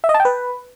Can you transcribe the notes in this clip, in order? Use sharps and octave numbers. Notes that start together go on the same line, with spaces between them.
E5
D#5
A5
G5
B4